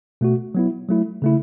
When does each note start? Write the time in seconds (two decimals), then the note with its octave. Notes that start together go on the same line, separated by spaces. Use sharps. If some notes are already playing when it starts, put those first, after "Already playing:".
0.21 B2 A3 F#4
0.55 F#3 B3 E4
0.89 F#3 A3 E4
1.22 C#3 A3 E4